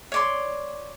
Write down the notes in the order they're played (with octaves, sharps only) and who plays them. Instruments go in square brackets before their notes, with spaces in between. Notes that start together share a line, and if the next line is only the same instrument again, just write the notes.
[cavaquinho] C#5 D5 C6